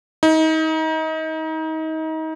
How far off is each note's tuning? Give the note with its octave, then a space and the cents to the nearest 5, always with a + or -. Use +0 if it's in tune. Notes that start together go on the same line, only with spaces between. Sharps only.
D#4 +30